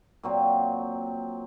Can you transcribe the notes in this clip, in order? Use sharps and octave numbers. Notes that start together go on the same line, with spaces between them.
A#2 F#3 C4